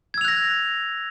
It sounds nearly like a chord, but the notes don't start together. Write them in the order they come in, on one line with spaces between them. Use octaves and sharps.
G#6 E6 F7 F#6 A#6